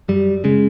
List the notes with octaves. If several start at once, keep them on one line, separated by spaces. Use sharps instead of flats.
F#2 G3
C#3 G#3